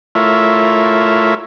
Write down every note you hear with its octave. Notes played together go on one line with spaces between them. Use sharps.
A3 E4 F4 A#4 C#5 E5